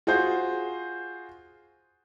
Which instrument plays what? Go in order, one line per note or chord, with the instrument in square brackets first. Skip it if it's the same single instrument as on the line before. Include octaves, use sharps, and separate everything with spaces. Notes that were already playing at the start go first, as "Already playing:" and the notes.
[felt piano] F4 F#4 G#4 C5